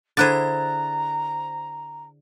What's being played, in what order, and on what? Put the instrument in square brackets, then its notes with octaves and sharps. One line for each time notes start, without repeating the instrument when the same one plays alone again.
[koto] D3 E4 G#4 [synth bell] C5 F#6 A6 [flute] A#5